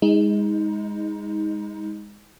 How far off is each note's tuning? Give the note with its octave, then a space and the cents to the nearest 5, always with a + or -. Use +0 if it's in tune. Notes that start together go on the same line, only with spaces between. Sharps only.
G#3 -15 D#4 +25